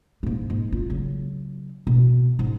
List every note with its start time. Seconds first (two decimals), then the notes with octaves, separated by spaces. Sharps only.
0.23 G#2 A#3
0.50 G#2
0.72 F4
0.90 C#3 F#3
1.87 B2
2.39 G#2